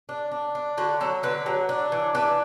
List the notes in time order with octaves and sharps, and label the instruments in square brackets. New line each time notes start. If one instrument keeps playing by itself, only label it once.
[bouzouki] D4
D4
D4
D3 F#4
F#3 A4
D3 B4
F#3
D4
E3
D4 B4